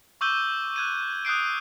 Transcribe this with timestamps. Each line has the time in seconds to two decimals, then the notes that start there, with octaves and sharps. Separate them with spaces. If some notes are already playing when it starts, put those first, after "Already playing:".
0.21 C#6 D6 E6 G6 D#7 G7
0.76 F#6 G#6 D#7
1.25 D#6 F#6 G6 C7 D7